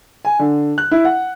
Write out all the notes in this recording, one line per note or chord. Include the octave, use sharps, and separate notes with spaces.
G#5
D3
F#6
E4
F#5